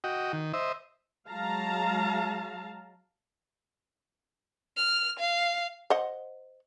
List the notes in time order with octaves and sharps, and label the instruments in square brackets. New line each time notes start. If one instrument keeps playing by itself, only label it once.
[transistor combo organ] F#4 D#5 G5
D#3
C5 D#5 E5
[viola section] F#3 G#3 F5 A5 A#5
[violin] F6
F5
[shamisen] C5 D#5 F#5